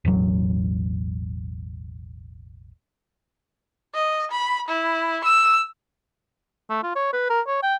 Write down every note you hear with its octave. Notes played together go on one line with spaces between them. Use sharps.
E1 A1 F#3
D#5
B5
E4
E6
A3
F4
C#5
B4
A#4
C#5
G5